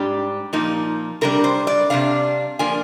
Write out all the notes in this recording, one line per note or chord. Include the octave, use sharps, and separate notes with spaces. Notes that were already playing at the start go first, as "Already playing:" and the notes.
Already playing: G#2 G3 D4 G4
A#2 F3 A#3 D#4
C3 G3 D4 A#4
C5
D5
C3 D#3 G3 D4 F5
F3 A#3 D4 G#5